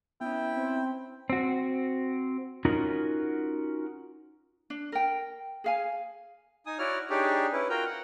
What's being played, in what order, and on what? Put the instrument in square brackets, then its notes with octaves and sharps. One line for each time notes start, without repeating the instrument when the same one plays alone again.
[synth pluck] B3 C#4 [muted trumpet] E4 [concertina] G5
[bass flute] C4
[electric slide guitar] C4 F#4
C#4 D#4 F4 F#4 A#4
[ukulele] D4
A#4 G5
G#4 F5 G#5
[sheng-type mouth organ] D#4 G#5 D#6
E4 F#4 C#5 D5 F6
D4 D#4 G4 G#4 C#5 D5
C#4 E4 B4
F4 F#4 A#4 G5 A#5
F#5